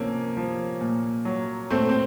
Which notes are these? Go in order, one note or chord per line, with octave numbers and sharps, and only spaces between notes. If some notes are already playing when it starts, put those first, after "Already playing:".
Already playing: C3 F3 A#3 C#4
F3
A#2
F#3
A#2 A3 C4
C4